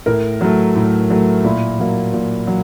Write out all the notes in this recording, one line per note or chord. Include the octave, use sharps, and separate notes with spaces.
A2 A#4
F#3 A3
A2
F#3 A3
A#2 E4
F#3 A#3
A#2
F#3